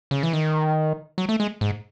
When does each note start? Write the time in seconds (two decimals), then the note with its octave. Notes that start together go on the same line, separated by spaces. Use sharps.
0.11 C#3
0.23 E3
0.33 D#3
1.18 F#3
1.29 A3
1.40 G#3
1.61 G#2